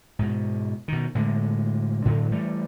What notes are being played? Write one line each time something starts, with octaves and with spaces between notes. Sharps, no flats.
G#2 B2
B2 D#3
A2 D3 G#3
A2 D3 F#3
E3 G3 A3